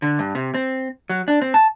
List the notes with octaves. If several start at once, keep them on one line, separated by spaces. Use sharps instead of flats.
D3
G2
C3
C4
F#3
D4
C4
A5